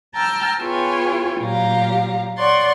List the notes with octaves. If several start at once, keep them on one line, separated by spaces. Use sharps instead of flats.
G5 A5 A#5 E6 F6 G6
B3 F4 G#4 C#5 G5 G#5
A#2 F#3 G4 F5 A#5
C#5 D5 F#5 C6 C#6